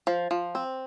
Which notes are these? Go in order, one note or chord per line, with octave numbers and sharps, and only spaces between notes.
F3
F3
C4